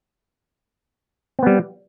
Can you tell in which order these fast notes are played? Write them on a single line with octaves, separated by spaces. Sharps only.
C4 B3 G3